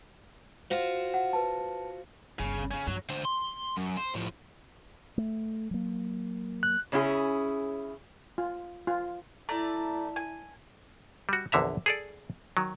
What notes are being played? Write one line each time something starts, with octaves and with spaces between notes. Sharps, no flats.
F4 F#4 C5
F#5
B4 A5
G1 C#2 C#3
C#3 C#4
G2 F#3 D4
D3 C5
C6
F#2
C5
A2 F3
A3
F#3 A#3
F#6
C#3 C#4 E4 G4 G#4
F4
F4
A3 E4 D5 A#5
G#5
G3 F#4
A#1 E2 D3 E5 A#5
G#4 A4 D5
D#3 F#3